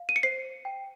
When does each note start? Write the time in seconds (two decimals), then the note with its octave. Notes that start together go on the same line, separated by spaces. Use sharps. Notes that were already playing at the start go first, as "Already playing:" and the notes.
Already playing: F5
0.09 D#7
0.16 C#7
0.23 C5 C7
0.65 G5